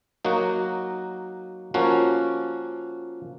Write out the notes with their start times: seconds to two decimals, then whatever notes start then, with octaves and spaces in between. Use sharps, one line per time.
0.25 F#3 A#3 D#4 F#4
1.74 F3 A#3 C#4 F#4